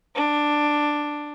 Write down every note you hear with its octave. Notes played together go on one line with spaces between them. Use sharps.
D4